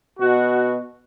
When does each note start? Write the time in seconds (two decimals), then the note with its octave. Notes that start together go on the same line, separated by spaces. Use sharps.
0.20 B2 F#4